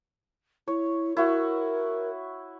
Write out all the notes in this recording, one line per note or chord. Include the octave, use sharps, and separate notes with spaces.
E4 C#5
E4 F#4 A#4